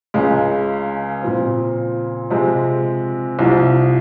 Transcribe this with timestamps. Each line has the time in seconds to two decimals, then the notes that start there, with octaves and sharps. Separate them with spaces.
0.14 C#2 C#3 G#3
1.22 A#2 F3 C4
2.30 C3 F3 G#3 C4
3.39 C2 C3 F3